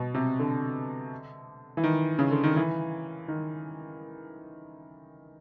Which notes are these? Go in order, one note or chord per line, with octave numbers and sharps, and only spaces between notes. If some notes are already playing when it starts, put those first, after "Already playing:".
Already playing: B2
C3
D3
E3
D#3
C#3
D3
D#3
E3
D#3